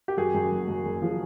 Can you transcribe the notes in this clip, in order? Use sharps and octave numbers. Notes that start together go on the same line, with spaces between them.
G4
F#2 F#4 G#4
F#2
F#1
F#2
F#1
F3